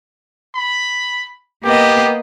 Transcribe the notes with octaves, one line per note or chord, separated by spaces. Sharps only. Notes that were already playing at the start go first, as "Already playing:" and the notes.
B5
A#3 B3 G4 D#5